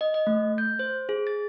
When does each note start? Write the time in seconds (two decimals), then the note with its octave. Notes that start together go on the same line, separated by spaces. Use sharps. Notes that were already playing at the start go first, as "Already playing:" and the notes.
0.01 D#5
0.14 D#5
0.27 A3
0.58 G6
0.79 C5
1.09 G#4
1.27 A6